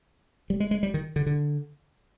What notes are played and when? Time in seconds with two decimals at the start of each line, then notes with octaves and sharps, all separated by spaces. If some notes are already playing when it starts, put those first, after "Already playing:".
0.50 G3
0.60 G#3
0.71 G#3
0.83 G3
0.94 D#3
1.16 D3
1.26 D3